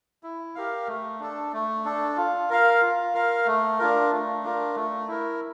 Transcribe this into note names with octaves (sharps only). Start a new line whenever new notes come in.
E4
G4 A#4 F5
A3
D4 A4
A3
D4 A4
F4
A#4 F5
F4
A#4 F5
A3
D4 F4 A#4
A3
D4 F4 A#4
A3
E4 A#4